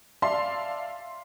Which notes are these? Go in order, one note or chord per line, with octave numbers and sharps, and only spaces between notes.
D5 E5 F5 A5 C6